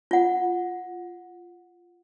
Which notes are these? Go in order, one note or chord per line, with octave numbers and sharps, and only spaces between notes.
F4 F#5